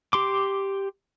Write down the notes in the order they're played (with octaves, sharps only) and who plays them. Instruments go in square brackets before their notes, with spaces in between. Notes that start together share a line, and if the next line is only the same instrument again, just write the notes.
[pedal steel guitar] G4 C6 D6